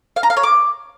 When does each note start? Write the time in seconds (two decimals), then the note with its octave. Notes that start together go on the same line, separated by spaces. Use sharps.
0.16 F5
0.23 A#5
0.30 F5
0.37 C#5
0.43 D6